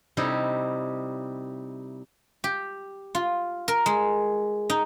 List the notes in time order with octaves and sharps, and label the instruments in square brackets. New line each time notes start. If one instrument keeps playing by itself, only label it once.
[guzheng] C3 G3 D#4 E4
G4
F4
A#4
G#3
D#4